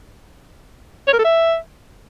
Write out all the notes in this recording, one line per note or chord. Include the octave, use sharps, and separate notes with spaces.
C#5
A#4
A4
E5